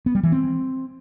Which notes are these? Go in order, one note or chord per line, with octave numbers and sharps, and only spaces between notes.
B3
G3
E3
C4